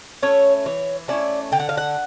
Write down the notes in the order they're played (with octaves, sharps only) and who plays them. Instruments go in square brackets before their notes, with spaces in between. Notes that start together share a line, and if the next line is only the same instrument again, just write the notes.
[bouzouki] A3 C#4 E4 C#5
E3 C#5
A3 C#4 E4 D5
D3 G5
F#5
F5
F#5